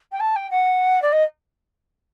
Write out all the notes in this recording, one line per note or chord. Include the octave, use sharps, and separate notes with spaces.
G5
A5
G5
F#5
D5
D#5